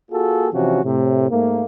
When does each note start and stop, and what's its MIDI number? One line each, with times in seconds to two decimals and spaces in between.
0.11 0.48 58
0.11 0.48 65
0.11 0.48 66
0.11 0.48 68
0.11 0.48 69
0.53 0.79 48
0.53 0.79 52
0.53 0.79 53
0.53 0.79 61
0.53 0.79 66
0.84 1.27 45
0.84 1.27 48
1.30 1.65 44
1.30 1.65 57
1.30 1.65 58